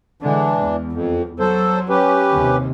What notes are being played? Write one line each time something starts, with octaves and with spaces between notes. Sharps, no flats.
D3 E3 G#3 D4
E2
F2
F#3 A4 C5
C#4 G4 B4
D#2 C3